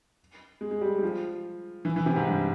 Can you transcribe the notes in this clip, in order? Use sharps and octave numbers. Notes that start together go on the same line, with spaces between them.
G#3
G#3
G3
G3
F3
E3
E3
C3
G#2
G2